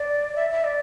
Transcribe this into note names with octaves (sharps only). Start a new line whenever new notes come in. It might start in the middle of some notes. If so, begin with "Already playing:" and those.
Already playing: D5
E5
E5
D5